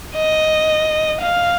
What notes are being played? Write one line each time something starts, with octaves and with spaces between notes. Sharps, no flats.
D#5
F5